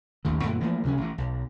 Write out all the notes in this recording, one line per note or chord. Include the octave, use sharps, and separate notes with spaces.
A1 D#2 D#3
F#2 A#2 D3 A3
E3 F3 A3 A#3
D2 C3 F#3 C#4
A1 E3
B1